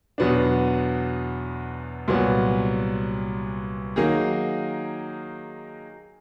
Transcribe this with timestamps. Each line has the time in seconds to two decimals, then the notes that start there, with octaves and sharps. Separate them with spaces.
0.18 E2 B2 F#3 B3 D4
2.08 C2 A#2 F#3 B3
3.96 D#3 F#3 A#3 D#4 G#4